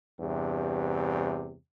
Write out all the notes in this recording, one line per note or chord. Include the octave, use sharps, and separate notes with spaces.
E2 G2 C3